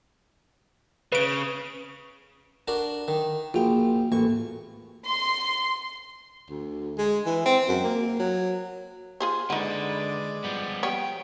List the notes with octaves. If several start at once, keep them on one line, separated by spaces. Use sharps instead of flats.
C#3 B4 D7
D4 F#4 A#4
D#3
A#1 F4 F#4 G#4 G5
A1 A#3 C#6
C6
D2
G#3
E3
C4
F#2
A#3
F#3
F4 G#4 C5
D3 G#3 D#4 B4 D5 F#5
F3 G3 B3
G3 B3 C#5 G5